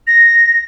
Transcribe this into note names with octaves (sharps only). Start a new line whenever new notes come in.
A#6